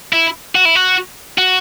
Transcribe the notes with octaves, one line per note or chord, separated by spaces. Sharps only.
E4
F#4
E4
F#4
F#4